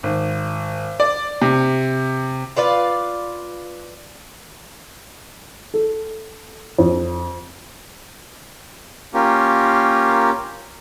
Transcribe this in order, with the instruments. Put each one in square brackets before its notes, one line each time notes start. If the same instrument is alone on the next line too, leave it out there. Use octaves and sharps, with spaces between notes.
[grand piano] G#1
D5
C3
[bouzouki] F4 B4 D5 F5
[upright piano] A4
F2
[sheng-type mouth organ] A#3 C#4 F4 G4 A#4